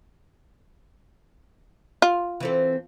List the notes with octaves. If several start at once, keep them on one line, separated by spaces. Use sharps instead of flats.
F4
E3 C4 A4